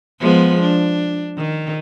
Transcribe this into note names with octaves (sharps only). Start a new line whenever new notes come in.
F3 G#3 B3
D4
D#3